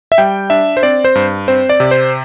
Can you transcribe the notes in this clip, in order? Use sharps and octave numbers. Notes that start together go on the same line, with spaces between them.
E5
G3 G5
D4 E5
C5
C4 D5
C5
G2
C4 C5
D5
C3
C5